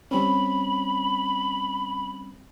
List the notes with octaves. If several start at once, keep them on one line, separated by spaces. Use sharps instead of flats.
G3 C4 C#4 B5